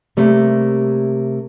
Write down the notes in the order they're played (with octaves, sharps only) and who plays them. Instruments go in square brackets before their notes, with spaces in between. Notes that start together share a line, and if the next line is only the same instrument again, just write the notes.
[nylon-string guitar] C3 G3 A3 A#3